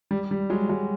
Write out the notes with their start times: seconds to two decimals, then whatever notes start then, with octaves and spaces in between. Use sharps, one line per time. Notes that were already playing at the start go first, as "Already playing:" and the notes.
0.11 G3
0.31 G3
0.50 F#3 G#3
0.69 F#3 G#3